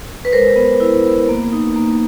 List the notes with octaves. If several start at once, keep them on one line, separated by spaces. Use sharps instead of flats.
B4
G#3 A#4 C5
B3
E4
B3
A#3
D#4
A#3